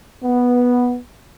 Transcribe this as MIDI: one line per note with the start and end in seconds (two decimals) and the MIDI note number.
0.24 0.97 59